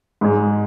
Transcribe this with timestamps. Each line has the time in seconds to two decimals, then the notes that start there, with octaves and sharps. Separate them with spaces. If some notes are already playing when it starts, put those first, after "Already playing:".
0.21 G#2 G#3